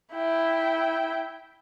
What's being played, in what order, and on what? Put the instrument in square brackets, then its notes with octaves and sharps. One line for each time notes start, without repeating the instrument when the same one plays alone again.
[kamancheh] E4 G5